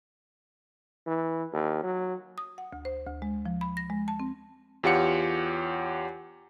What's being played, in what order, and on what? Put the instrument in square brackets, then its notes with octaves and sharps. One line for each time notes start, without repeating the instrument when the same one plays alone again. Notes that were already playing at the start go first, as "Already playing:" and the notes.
[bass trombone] E3
D#2
F#3
[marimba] D#6
F#5
D2
C5
D2
G#3
F3
B5
A#6
G#3
A5
C4
[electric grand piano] E2 F4 G4 C#5 F#5 C#7